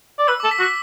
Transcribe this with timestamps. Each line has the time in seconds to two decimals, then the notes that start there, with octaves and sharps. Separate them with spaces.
0.19 D5
0.28 B4 E6
0.40 A4 D6
0.51 B6
0.59 F#4
0.63 B6